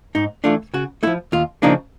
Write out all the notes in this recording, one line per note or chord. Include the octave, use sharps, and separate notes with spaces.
G#2 D#4
E3 A3 D4 F4
C#3 F#4
F3 A3 E4
D#2 F4
C#3 F3 A#3 D4 D#4